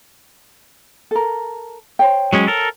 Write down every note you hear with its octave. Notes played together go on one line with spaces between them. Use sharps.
A4 A#4
C5 C#5 G5
F#3 G#3 C#4
A4 A#4